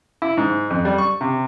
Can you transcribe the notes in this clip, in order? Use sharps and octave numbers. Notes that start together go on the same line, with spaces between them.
E4
G#2
F2
G3
C#6
C3